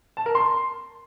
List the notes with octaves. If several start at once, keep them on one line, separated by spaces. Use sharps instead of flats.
A5
A#4
C6